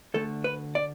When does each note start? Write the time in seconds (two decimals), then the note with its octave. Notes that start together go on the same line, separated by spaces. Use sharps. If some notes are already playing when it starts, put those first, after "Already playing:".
0.14 D2 D3 A3 A4
0.44 B4
0.75 D5